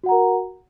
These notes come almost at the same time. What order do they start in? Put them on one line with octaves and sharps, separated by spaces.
F#4 F#5 A#5 A#4